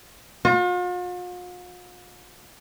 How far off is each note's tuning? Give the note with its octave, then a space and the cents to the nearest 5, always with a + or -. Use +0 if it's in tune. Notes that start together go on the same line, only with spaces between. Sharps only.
F4 +45